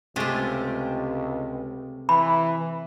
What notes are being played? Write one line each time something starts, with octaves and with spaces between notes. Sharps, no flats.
C#2 C3 G#3 A3 F4 G4
E3 B5